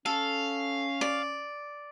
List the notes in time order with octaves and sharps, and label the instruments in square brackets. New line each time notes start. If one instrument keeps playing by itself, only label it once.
[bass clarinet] C#4 [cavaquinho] A4 [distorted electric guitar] F5
[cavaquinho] D5